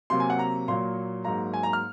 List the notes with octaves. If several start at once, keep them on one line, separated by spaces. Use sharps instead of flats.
C3 F#3 A#3 C6
G#5
F#5
A#5
A#2 F#3 A#3 C6
G#2 F#3 A#3 A#5
G#5
A#5
F6